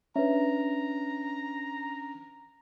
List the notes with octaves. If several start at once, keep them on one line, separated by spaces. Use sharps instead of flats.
C#4 D4 B4 E5 A#5